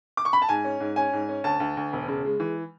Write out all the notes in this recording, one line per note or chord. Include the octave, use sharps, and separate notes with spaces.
D6
C#6
B5
A5
G#2 G#5
C#4
G#2
C#4 G#5
G#2
C#4
D2 A5
D2
D2
E1
C#3
G#3
E3